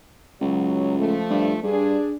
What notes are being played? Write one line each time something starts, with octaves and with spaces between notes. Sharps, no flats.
C#2 F#3
F3 A3
G2
G2 D4 G#4